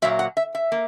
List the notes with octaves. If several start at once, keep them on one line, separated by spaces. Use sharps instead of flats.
A#2 F#3 A#3 E5
F#5
E5
E5
A#3